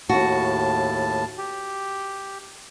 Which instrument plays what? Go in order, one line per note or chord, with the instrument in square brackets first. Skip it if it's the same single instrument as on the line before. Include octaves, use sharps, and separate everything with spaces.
[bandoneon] D#2 A2 A5 [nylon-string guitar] F#4
[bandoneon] G4